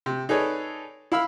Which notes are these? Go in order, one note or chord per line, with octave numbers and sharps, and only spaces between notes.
C3
D#4 G#4 A4 B4 C#5 D5
E4 F5 B5 E6 F6